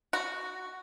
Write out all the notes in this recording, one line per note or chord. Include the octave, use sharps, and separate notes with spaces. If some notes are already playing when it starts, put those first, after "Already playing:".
F#4